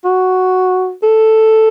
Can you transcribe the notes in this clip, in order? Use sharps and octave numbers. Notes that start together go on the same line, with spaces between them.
F#4
A4